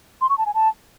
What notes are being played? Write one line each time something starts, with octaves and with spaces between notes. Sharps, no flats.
C6
C#6
A5
G#5
A5